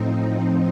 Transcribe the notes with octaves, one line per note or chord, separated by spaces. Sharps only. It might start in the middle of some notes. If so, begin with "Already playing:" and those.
Already playing: A2 F3 C4 D#4